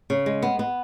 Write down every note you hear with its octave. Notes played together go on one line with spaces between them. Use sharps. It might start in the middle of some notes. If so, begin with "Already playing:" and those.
C#3
G#3
B3
B3